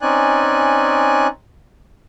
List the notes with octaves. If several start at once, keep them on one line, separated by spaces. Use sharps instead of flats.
C4 C#4 D#4 D5 G#5 F#6